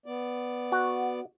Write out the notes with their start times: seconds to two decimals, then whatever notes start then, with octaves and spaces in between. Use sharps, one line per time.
0.06 B3 D5
0.72 F#4